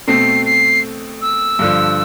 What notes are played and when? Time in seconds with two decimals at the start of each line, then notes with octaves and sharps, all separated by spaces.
0.07 B2 A3 C4 C7
0.45 C7
1.21 E6
1.59 G2 D3 F3